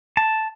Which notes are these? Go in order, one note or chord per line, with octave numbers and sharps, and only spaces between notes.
A5